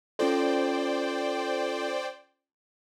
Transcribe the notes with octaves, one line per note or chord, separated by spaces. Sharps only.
C#4 F4 A4 C5 D5 G5